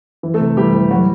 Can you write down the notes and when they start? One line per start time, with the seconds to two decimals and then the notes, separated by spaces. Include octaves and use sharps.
0.23 E3
0.34 A3 A4
0.40 C3
0.57 E3 G3 G4
0.74 E3
0.90 F#3 G3 F#4